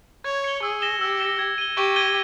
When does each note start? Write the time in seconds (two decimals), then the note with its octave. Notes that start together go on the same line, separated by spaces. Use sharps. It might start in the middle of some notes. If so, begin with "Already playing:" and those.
0.24 C#5 G#6
0.44 C#7 G7
0.63 G#4 E6
0.82 A#6 E7 G7
1.01 G4 E6
1.20 A#6 C#7 E7 G7
1.39 G#6
1.58 D#7 G7
1.77 G4 C#6
1.96 G#6 D#7 G7